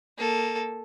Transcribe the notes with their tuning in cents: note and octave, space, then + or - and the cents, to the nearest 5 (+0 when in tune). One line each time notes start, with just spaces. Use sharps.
A#3 +0 A4 -5